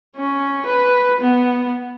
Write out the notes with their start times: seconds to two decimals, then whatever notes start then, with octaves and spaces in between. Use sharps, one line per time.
0.16 C#4
0.66 B4
1.20 B3